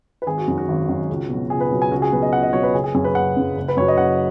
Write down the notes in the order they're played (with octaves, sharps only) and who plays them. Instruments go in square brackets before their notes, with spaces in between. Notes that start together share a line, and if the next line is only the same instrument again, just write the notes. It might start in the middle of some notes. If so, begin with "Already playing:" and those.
[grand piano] B4
G#1 G#4
F#4
F#2 D#3
F#4
G#1
F#2 D#3
C#2
B2 F#3
C#2 G#4
B4
B2 F#3
G#5
C#2 F#4
G#4
B2 F#3 B4
D#5
C#2 F#5
D#5
B2 F#3 C#5
B4
F#1 G#4
G#4
F#2 C#3 G#4
B4
F#1 F#5
F#2 C#3
F#1
B4
F#2 F#3 C#5
D#5
F#1 F#5